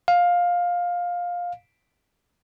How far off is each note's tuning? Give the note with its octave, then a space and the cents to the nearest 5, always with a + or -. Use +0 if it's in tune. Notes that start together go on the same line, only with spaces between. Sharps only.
F5 +15